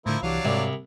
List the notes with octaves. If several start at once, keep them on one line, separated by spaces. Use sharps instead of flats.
A2 D3 F3 A#3 E4
C2 E3 F#3 D4 G4 F5
C2 G#2 D5